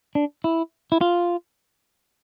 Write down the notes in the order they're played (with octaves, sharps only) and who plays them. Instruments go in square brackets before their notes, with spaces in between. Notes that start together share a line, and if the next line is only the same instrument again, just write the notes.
[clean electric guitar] D4
E4
E4
F4